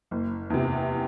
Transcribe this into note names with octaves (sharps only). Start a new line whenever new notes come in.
F#1
E2 C3